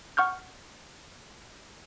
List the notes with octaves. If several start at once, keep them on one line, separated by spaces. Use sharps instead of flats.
F#5 C#6 F6 G6